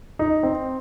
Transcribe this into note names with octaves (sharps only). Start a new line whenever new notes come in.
D#4
C4